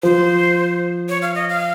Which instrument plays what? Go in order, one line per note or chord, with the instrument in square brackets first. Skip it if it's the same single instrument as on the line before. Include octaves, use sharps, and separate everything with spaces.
[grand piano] F3 [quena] C5
[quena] C#5
F5
D#5
F5